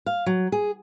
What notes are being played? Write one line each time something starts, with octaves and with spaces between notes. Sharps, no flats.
F5
F#3
G#4